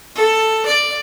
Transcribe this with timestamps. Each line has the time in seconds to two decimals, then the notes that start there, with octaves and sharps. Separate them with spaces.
0.15 A4
0.66 D5